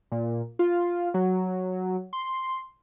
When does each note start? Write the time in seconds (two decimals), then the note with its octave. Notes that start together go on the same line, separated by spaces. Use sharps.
0.12 A#2
0.59 F4
1.14 F#3
2.13 C6